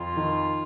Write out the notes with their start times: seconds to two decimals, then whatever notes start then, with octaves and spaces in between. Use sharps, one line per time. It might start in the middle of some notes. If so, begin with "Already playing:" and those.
Already playing: F2 F4
0.16 D#3